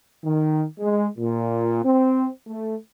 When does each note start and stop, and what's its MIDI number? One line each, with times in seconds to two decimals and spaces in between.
0.24 0.63 51
0.79 1.05 56
1.18 1.80 46
1.83 2.27 60
2.46 2.75 57